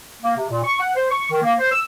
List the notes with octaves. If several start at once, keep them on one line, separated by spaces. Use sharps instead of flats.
A#3
C3
A#2
C#6
F#5
C5
C#6
D#3
A#3
C5
E6